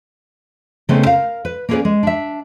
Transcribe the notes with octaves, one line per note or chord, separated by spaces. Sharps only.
C#3 A3 B3 C4 D#4
A#4 F5
B4
A#3 C#4 E4 G#4 B4 D5
G#3
D4 E5